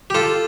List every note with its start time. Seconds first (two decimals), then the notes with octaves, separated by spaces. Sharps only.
0.10 G4
0.15 F4 A4